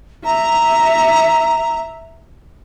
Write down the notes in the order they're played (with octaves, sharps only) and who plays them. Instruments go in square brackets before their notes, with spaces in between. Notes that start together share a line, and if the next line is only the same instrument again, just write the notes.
[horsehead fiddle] E5 [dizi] A#5